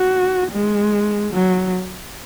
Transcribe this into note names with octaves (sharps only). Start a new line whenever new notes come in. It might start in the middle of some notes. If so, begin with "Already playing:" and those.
Already playing: F#4
G#3
F#3